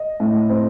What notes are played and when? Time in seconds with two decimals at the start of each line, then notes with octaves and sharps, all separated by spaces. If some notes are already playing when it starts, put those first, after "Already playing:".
Already playing: D#5
0.20 A2
0.49 C4